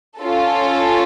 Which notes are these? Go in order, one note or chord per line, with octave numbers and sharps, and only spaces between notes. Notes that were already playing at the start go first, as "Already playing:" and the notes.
C#4 F4 A4